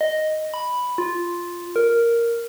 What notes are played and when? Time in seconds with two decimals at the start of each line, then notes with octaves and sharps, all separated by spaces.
0.01 D#5
0.54 B5
0.98 F4
1.76 A#4